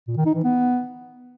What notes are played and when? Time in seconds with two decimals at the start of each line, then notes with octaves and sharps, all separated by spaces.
0.08 A#2
0.17 D#3
0.26 D#4
0.35 E3
0.44 B3